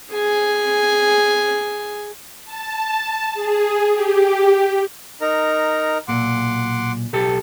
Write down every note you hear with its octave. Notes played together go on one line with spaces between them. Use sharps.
G#4 G#5
A5
G#4
G4
D#4 A#4 A#5
B1 A#2 F#5 C6 D6
B1 G4 A4